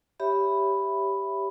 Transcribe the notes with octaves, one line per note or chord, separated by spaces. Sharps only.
G4 C#5 E5 B5